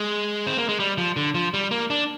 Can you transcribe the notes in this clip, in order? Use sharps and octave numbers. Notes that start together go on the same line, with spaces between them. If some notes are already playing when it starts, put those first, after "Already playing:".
Already playing: G#3
C4
A#3
G#3
G3
F3
D3
F3
G3
A#3
D4